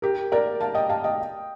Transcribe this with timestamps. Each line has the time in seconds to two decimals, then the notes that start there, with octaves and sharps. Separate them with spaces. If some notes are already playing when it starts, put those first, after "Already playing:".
0.02 G4 A#4
0.32 A#4 D5
0.61 F5 A5
0.75 D#5 G5
0.89 F5 A5
1.04 D#5 G5